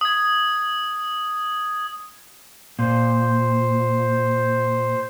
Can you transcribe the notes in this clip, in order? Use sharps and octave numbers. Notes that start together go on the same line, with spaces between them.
D#6 G#6
A#2 C5